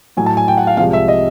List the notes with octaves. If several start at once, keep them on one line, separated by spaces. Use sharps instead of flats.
A2 F#3 G#5
A5
G#5
G5
F#5
F5
C2 C3 F3 G#3 F5
E5
D#5